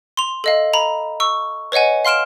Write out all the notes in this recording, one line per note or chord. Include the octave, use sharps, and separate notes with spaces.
C6 F7
A4 D#5 F5
A#5 B5
C#6 E6
B4 C#5 D#5 F#5 G#5
F5 C6 F6 D7 E7